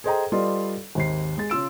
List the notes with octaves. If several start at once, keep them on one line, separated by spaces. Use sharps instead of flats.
G#4 A4 C5 D#5 G5 A#5
G3 F4 A4 B4 D5 D#5
G#1 D#2 C7
G#3 A6
C#3 F4 E6 D7